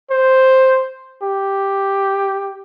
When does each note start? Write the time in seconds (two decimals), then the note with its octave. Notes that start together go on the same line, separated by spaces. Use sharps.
0.10 C5
1.23 G4